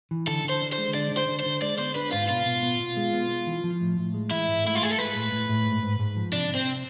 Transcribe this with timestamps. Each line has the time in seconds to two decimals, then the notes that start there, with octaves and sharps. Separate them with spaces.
0.11 E3
0.28 D3 A4
0.45 D3 C5
0.62 D4
0.73 C5
0.78 G#3
0.95 D3 D5
1.11 D3
1.17 C5
1.29 D3
1.40 C5
1.46 D3
1.62 G#3 D5
1.79 B3 C5
1.96 D4 B4
2.13 G#2 F4
2.29 B2 F4
2.46 B2
2.63 B3
2.80 B2
2.97 G#3
3.13 B3
3.30 B3
3.47 E3
3.64 F3
3.81 A2
3.98 A2
4.14 G#3
4.31 E3 E4
4.48 G#2
4.65 A3 E4
4.75 F4
4.82 A3 G#4
4.91 A4
4.98 G#3 B4
5.15 A2
5.32 A2
5.49 A2
5.66 G#2
5.83 G#2
5.99 G#2
6.16 F3
6.33 C3 D4
6.50 C3
6.55 C4